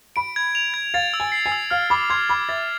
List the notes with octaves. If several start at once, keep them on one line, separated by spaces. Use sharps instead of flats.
B5 D7
G#6
F7
G#6
F5 A6
E6
G#5
C7
G#5
E6
F5 F6
B5 D6
C6 G#6
B5 D6
E5 A6